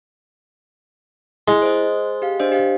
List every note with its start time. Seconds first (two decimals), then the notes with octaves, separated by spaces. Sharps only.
1.48 G#3 E4
1.62 C5 D#5
2.22 G4 F5
2.40 D4 C5 D#5
2.52 G4 F5